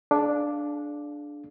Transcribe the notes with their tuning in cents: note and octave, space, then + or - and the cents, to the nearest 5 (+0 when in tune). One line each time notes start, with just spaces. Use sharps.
D4 +0 G#4 +45 F5 +0